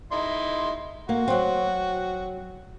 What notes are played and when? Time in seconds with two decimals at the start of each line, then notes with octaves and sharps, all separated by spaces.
0.12 D#4 E4 C6
1.09 A#3 F#4
1.28 F#3 C4